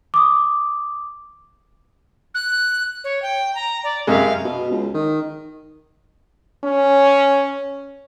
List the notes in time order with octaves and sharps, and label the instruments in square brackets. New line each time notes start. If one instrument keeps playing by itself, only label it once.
[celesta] D6 D#6
[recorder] F#6
C#5
G5
A#5
D5
[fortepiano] F#2 C3 G#3 [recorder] F5
[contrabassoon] B2
C#2
D#3
[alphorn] C#4